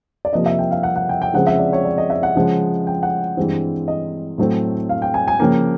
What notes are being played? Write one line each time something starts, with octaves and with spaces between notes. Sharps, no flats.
D5
C3 F3 A#3 D#5
E5
G5
F5
F#5
F#5
G5
G5
C#3 F3 G#3 C4 F#5
E5
D5
C#5
D5
D#5
E5
F#5
C#3 F3 G#3
G5
F#5
G2 E3 G#3 C4
D#5
A2 F#3 A3 C4
F5
G5
G#5
G#5
C#3 F3 A#3 G5